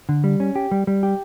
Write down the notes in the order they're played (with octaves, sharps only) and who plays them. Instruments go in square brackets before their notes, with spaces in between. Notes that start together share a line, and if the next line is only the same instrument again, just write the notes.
[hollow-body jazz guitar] D3
G3
C#4
G4
G3
G3
G4